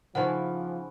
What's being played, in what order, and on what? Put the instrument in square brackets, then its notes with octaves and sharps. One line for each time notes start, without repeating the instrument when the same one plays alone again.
[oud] C#3 E3 C5 [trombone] F3 [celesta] D#4 F#5